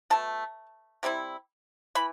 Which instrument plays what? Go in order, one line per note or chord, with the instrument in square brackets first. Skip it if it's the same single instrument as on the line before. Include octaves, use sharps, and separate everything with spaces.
[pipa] B2 A3 A5
C3 G3 C4 E4
E3 B5